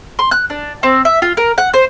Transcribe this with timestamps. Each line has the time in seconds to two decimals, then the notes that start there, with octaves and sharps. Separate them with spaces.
0.19 C6
0.31 F#6
0.50 D4
0.83 C4
1.05 E5
1.22 F4
1.37 A#4
1.58 F#5
1.74 C5